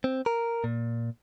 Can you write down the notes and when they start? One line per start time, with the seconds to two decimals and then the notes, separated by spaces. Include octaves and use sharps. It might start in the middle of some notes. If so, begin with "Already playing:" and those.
0.04 C4
0.26 A#4
0.64 A#2